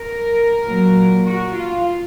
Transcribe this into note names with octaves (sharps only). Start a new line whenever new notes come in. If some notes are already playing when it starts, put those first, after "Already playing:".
Already playing: A#4
A#2 F#3
F#4
F4